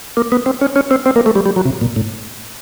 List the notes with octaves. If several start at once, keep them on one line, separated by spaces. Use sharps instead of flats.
A#3
B3
C4
C#4
C#4
C4
C4
A#3
A3
G3
G3
F#3
C3
A#2
A2